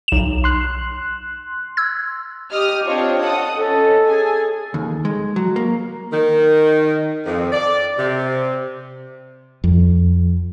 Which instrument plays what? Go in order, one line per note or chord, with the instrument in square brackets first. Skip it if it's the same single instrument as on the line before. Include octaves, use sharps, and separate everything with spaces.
[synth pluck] B1 E7
[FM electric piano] C6 F#6
[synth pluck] E6 G#6
[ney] G4 [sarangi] D#5 [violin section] D#6 F6
[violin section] C4 D4 C#5 [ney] F4 [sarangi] D#5
[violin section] A4 F#5 D#6
[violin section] C#4 [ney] A4
[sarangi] G#4 [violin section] G#5
[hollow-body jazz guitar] D#2
G#3
F#3
A#3
[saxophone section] D#3
F2
D5
C3
[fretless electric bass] F2